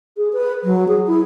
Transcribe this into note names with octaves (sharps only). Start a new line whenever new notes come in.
G#4
B4
F#3
G#4
E4